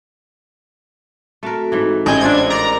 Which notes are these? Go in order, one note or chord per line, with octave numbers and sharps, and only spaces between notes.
A3 C4 F#4 A4 A#4
G#2 E3
A1 G4 E5 G#5 G6
C4 D4 F4 C5 G#6
G4 A#4 D5 A#5